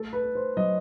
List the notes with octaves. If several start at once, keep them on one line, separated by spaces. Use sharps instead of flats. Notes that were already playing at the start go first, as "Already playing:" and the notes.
Already playing: A3 A4
B4
A3
C5
F#3 D#5